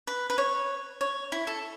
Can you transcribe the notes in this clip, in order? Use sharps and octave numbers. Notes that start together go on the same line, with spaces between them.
B4
B4
C#5
C#5
E4
A4